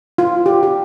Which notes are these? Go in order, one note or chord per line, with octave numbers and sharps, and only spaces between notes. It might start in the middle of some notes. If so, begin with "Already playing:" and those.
F4
G4
G4